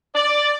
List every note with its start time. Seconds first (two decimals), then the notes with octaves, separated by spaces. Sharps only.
0.15 D5